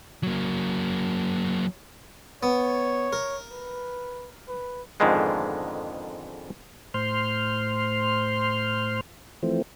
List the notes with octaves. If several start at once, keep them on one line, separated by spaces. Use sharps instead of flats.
F#3 A#3
B3 C#5
A#4
B4
B4
F2 G#2 D3 D#3 G#3 B3
A2 C5 C6 F6
E3 F3 A3 C4